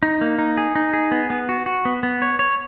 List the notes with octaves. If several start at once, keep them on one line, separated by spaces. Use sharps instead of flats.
D#4
A#3
D#4
G#4
D#4
G#4
B3
B3
F#4
F#4
B3
B3
C#5
C#5